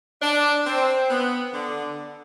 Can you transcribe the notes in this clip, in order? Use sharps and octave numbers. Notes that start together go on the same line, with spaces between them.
D4
C4
B3
D3